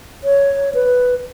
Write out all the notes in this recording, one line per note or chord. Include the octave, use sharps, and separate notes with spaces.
C#5
B4